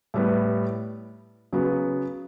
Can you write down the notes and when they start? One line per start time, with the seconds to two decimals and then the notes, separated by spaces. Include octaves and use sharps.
0.14 A2 G3 B3
1.53 C#3 F#3 B3